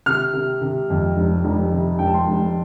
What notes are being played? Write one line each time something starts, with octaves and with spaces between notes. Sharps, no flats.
C3 F6
C3
C3
F2
F1
F1
C3
F1 G5
A5
C6
F1